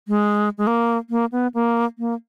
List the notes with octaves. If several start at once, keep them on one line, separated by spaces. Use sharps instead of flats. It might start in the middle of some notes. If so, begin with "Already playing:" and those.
G#3
G#3
A#3
A#3
B3
A#3
A#3